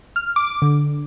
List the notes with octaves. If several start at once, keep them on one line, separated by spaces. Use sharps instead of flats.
F6
D6
D3